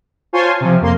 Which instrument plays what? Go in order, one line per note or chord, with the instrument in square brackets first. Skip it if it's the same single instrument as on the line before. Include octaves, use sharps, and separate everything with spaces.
[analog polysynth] F4 C5 C#5 G#5 A5 C6
C3 F3
F2 A#3 C6